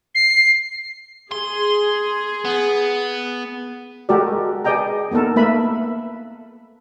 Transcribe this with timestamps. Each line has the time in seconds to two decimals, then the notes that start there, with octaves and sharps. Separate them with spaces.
0.15 C7
1.32 G#4 C6
2.45 B3
4.09 G#3 F#4 G4 A4 A#4 D5
4.65 G#4 B4 D5 D#5 G5 A#5
5.11 A#3 B3 D#4 A4 A#4
5.36 A3 A#3 B4 E5 B5